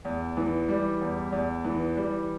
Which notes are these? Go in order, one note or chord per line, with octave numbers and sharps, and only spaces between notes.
E2
E3
G3
E2
E2
E3
G3